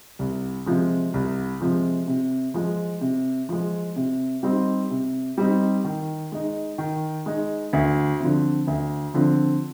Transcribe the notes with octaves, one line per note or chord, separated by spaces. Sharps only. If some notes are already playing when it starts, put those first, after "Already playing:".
C2
C3 F3 G#3
C2
C3 F3 G#3
C3
F3 G#3
C3
F3 G#3
C3
G3 C4 D#4
C3
G3 C4 D#4
D#3
G#3 D#4
D#3
G#3 D#4
D2
D3 F3 C4
D2
D3 F3 C4